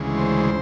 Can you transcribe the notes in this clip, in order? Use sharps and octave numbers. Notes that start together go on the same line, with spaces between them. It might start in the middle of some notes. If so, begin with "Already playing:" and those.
Already playing: D2 C#3 E3 G#3
C5